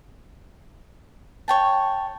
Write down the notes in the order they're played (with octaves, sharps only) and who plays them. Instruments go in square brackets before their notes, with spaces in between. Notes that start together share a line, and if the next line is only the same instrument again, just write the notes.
[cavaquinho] C#5 G5 A5